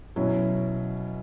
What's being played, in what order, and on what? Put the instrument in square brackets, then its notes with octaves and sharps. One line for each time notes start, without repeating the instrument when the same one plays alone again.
[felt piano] B2 F#3 C#4 E4